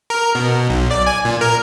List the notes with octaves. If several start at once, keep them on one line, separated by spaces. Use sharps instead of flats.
A#4
B2
B1
D5
G#5
A#2
A#4